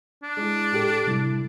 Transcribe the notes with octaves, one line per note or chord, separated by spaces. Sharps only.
D4
G#3 E4
A2 G4 A4
C3 G3 E4